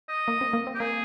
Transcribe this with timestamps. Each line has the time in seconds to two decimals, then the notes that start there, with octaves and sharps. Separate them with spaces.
0.09 D#5
0.28 A#3
0.41 C4
0.53 A#3
0.67 C4
0.75 G4
0.80 A#3 G#4